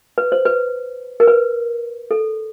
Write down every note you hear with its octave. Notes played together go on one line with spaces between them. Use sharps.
B4
C5
B4
A#4
B4
A4